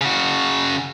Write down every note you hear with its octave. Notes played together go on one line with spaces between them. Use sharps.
C#3 F#4